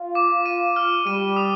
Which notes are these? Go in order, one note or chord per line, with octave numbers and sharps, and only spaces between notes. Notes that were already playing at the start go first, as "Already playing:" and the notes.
Already playing: F4
D6
D#7
F6
G3 D#7
D#6